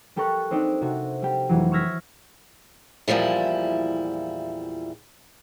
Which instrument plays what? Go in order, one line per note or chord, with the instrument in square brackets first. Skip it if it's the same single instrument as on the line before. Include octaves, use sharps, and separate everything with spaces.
[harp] G3 G4 A4 A#4 C#6 F#6
C4 D4 D#4 G4
C3 F#4
G3 G4
F1 E3 F#3
C#6 E6 F6 G#6 A#6 B6
[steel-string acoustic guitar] E2 A#2 F3 G3 E4